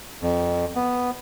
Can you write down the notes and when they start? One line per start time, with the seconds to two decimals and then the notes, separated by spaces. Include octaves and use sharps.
0.21 F2
0.75 B3